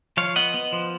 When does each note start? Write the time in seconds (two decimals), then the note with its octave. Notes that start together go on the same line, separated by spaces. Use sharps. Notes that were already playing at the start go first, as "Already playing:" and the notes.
0.17 F3 C#5 F5
0.36 B3 D#5 F#5
0.54 B3
0.73 F3